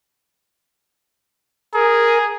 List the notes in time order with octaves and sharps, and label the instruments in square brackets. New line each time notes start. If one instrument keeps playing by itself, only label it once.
[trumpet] G#4 [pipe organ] A#4